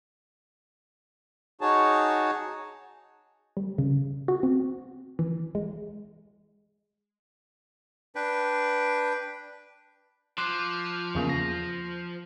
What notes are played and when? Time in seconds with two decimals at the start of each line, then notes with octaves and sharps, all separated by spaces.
1.61 D#4 F#4 G#4 C#5 A5
3.57 G3
3.78 C#3
4.28 F#4
4.43 C4
5.19 E3
5.55 G#3
8.15 D4 B4 G5
10.38 F3 C6 D6 F#6
11.15 E2 C#3 A#3
11.29 A#6